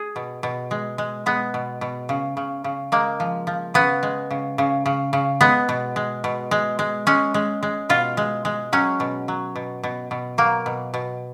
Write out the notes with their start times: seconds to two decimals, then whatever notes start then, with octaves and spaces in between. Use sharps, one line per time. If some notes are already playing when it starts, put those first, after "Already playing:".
Already playing: G#4
0.16 B2
0.43 B2
0.71 G#3
0.98 G#3
1.26 G#3 B3
1.54 B2
1.81 B2
2.09 C#3
2.37 C#3
2.64 C#3
2.92 G#3 A#3
3.20 F3
3.47 F3
3.74 C#3 B3
4.03 G#3
4.31 C#3
4.58 C#3
4.86 C#3
5.13 C#3
5.41 G#3 B3
5.69 B2
5.96 G#3
6.24 B2
6.51 G#3
6.79 G#3
7.07 G#3 C#4
7.34 G#3
7.63 G#3
7.89 B2 F4
8.17 G#3
8.45 G#3
8.73 F#3 C#4
9.00 B2
9.28 F#3
9.56 B2
9.83 B2
10.11 B2
10.38 F#3 A#3
10.66 B2
10.94 B2